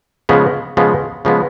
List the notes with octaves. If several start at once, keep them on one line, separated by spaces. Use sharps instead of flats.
C#3 F3 G#3 B3
C#3 F3 G#3 B3
C#3 F3 G#3 B3